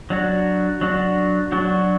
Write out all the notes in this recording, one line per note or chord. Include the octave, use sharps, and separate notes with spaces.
F#3 D4 F#4
F#3 D4 F#4
F#3 D4 F#4